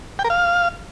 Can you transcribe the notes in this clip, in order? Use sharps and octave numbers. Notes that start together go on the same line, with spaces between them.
G5
A#4
F5